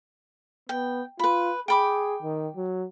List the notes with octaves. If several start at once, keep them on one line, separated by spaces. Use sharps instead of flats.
B3 G5
F4 B4 B5
G#4 G5 B5 D6
D#3
F#3